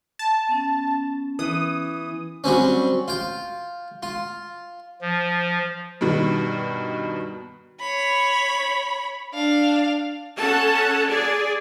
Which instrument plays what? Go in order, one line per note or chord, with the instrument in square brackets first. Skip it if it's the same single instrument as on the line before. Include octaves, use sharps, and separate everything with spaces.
[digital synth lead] A5
[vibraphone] B3 C#4
[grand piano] E3 [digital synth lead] D#6
[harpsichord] F#3 G3 C4 C#4
F4 G5
F4
[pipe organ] F3
[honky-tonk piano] G2 B2 D#3
[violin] C#5 B5
D4 F5
[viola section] C#4 A4 F#5 A5
G#4 D5